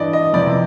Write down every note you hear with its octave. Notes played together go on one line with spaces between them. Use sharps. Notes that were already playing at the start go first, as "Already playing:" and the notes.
Already playing: G2 E3 D5 D#5
D#5
F2 C3 E3 D5